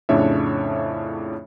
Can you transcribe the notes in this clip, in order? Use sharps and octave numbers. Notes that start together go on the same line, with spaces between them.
F2 A2 C#3 D4 C#5 E5